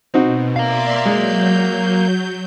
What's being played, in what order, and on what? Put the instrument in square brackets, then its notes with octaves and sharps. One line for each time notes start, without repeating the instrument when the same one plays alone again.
[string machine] B2 [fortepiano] C4 D#4 F#4
[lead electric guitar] A#4 F5 [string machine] D5 E5 C6
[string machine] F#3 G6 [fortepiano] G#3